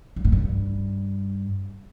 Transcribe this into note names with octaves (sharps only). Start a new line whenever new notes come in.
G2
A2
G2